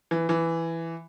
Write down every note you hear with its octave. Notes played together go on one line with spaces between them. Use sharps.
E3
E3